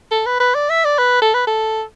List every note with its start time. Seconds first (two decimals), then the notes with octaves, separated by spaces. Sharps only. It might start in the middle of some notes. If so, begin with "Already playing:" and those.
0.11 A4
0.26 B4
0.40 B4
0.55 D5
0.70 E5
0.85 D5
0.98 B4
1.22 A4
1.34 B4
1.47 A4